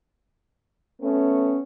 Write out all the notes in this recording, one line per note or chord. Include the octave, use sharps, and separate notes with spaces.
A3 B3 C#4